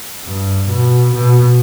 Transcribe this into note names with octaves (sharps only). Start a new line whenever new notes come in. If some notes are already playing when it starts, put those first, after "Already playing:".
G2
B2
B2